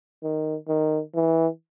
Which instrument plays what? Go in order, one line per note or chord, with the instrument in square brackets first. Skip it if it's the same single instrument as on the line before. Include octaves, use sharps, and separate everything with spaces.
[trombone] D#3
D#3
E3